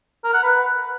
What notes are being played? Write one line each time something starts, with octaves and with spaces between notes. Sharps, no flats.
A#4
F#5
B4